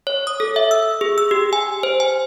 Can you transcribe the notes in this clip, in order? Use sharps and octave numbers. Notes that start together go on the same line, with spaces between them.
C#5
D#6
A4
E5
E6
G#4
E6
G4
G#5
C5
G#5